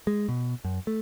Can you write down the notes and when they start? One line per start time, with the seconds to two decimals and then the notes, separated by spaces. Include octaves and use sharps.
0.07 G#3
0.29 B2
0.65 F#2
0.87 A3